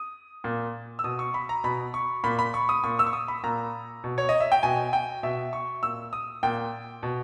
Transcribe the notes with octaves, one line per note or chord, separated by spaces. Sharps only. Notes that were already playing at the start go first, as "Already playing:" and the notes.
Already playing: D#6
A#2
E6
B2 D#6
C#6
B5
A#5
B2 B5
C#6
A#2 B5
B5
C#6
D#6
A#2 C#6
E6
C#6
D#6
B5
A#2 A#5
B2
C#5
D#5
E5
G5
B2 G#5
G5
B2 E5
C#6
A#2 E6
D#6
A#2 G5
B2